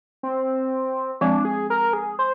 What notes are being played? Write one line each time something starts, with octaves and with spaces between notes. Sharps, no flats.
C4
F3 G#3 C4 D4
G#4
A#4
G#4
C5